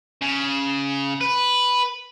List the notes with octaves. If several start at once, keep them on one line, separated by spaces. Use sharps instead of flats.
C#3
B4